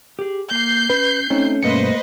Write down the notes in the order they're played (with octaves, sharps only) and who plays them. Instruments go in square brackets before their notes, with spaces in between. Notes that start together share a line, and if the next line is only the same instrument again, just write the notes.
[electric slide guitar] G4 G#4
[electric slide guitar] A#3 [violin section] G6 C7
[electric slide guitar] C#4 [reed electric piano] B4
[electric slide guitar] A3 [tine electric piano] C4 D#4 [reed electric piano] C#4
[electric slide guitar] G2 B2 [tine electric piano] A3 A#3 C#7 [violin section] B4 C5 D#5